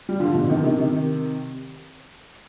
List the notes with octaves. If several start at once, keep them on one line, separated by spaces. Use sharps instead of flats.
G3
D3 F3
B2 D3
C3 D#3
C3 D#3
C3 D#3